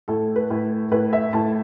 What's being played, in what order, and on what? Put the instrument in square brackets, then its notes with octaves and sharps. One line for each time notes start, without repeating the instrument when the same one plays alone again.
[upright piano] A2 A4
B4
A2
A2 B4
E5
A2 A5